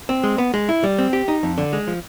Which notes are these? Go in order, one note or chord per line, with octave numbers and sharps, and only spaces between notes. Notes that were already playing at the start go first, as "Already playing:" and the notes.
C4
G#3
B3
G#3
E4
G3
C4
G4
D#4
F2
D3
G#3
F3